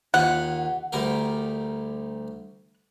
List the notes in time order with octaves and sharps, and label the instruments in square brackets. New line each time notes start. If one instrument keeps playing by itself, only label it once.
[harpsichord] D#2 F4 [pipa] F#5
[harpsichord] D2 G3 A#4